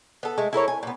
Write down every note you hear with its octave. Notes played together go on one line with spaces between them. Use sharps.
B3 A4
G#3 A3
E4 A4 A#4 C#5
G#5
A#2 B3